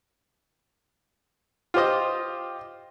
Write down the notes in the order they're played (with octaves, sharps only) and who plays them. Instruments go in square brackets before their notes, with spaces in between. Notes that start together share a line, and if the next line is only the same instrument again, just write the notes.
[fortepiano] F4 G4 C5 D#5